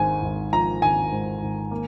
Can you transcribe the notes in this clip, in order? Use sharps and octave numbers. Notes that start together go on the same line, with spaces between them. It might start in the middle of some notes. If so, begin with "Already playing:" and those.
Already playing: G#1 G#2 G#5
G#1
F3 A#5
G#1 G#5
G#2
G#1
A#3